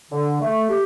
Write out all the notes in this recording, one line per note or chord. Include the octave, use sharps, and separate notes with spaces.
D3
A3
G4